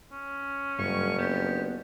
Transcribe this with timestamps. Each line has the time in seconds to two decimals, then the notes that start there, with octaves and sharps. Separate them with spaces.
0.12 C#4
0.79 F#1 G2 C#6
1.19 B3 D4 G4